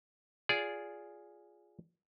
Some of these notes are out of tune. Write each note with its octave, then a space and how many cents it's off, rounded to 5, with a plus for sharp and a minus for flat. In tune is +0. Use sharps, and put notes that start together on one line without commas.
F4 +0 G#4 +0 D5 -20